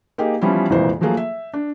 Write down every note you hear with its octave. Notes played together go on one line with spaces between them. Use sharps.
A#3 D#4 G4 G#4
E3 F3 G3 B3 C#4 E4
E1 C2 F2 A#2 E3 C5
F3 F#3 A3 A#3 G#4 A4
E5
D4